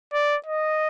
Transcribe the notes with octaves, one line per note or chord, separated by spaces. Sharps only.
D5
D#5